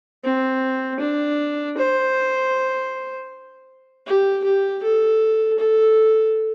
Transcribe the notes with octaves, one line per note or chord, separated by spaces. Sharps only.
C4
D4
C5
G4
G4
A4
A4